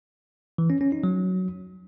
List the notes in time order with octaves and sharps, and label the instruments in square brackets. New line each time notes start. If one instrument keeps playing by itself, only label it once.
[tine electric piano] E3
C#4
C#4
D#4
F#3